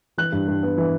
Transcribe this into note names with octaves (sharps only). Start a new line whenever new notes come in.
E3 F#6
G2
G2
B3
E3